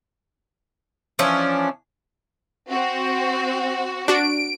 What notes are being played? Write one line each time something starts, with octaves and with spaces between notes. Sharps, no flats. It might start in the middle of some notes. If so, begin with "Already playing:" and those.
E3 F3 C#4 D4
C4 F#4
D4 F#4 D7